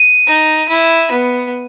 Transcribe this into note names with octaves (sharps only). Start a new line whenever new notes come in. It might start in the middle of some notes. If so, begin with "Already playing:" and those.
Already playing: D#7
D#4
E4
B3